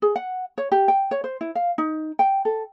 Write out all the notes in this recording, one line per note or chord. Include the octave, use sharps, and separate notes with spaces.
G#4
F#5
C#5
G4
G5
C#5
C5
E4
F5
D#4
G5
A4